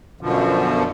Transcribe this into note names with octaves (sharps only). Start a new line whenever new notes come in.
F#2 B2 D3 F3